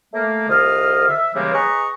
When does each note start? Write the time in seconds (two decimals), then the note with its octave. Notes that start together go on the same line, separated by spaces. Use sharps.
0.13 A3 A#3
0.48 C2 D3 F4 D#5 F6
1.07 E5
1.34 C#3 E3 G3 G#3 A#3
1.53 G#4 B4 D#5 A#5 C#6